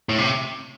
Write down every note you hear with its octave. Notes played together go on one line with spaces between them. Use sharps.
A2
C3